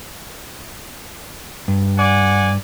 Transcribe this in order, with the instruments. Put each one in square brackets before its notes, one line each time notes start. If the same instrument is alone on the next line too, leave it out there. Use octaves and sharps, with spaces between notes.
[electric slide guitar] G2
[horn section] D5 F#5 G#5